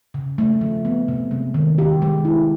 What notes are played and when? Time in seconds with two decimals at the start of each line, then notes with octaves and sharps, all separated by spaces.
0.14 C#3
0.38 A3
0.61 F3
0.85 B3
1.08 C3
1.31 G#3
1.54 D#3
1.78 G4
2.02 G#3
2.25 E4